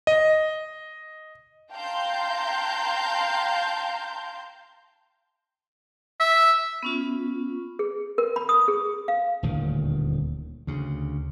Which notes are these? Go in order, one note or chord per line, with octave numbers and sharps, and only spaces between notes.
D#5
F5 G5 A5 A#5 C6 G6
E5
B3 C#4 F4
G#4
A#4
B5
D#6
G#4
F5
D#1 D2 A2 D#3
D2 C#3